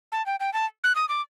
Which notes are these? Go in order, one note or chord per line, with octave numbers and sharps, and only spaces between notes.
A5
G5
G5
A5
F#6
D#6
D6